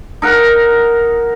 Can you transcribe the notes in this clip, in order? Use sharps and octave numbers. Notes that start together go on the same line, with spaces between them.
D#4 A#4 F#5